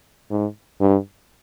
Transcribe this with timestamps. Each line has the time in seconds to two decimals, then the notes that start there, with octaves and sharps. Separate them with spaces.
0.31 G#2
0.81 G2